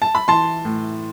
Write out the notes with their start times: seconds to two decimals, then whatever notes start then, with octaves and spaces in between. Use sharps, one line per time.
0.02 A5
0.15 B5
0.28 E3 A5 C6
0.65 A2